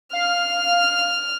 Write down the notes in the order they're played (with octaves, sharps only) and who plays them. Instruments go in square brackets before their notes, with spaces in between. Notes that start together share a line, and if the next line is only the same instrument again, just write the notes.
[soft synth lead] F5 [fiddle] F6